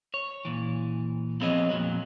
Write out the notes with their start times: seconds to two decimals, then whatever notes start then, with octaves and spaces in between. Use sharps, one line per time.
0.14 C#5
0.45 A#2 E3
1.40 F3 B3 C4 G#4 C#5 D#5
1.70 F2 A#2 F#3